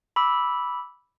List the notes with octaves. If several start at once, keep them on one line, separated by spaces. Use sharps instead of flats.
B5 D6 E6